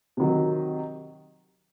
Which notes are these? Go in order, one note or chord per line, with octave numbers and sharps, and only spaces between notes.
C3 D#3 F#3